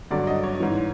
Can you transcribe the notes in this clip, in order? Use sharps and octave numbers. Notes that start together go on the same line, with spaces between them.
G2 D3 F#3 D5
D#5
C#5
G#2 E3